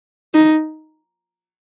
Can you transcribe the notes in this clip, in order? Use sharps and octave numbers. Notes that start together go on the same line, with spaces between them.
D#4